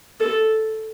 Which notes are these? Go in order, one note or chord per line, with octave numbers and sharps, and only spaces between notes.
A4